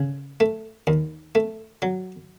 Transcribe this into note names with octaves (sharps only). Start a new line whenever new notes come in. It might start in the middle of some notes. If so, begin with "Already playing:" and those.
Already playing: C#3
A3
D#2
A3
F#3